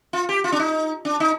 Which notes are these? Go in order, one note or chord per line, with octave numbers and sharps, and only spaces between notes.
F4
G4
F4
D4
D#4
D4
D#4